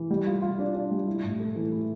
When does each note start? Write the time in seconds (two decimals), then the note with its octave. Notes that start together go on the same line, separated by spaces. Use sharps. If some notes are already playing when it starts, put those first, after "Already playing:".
Already playing: E3
0.10 G3
0.27 F4
0.42 F4
0.59 D4
0.75 D4
0.91 G3
1.07 E4
1.24 A2
1.40 A3
1.56 E3
1.71 E4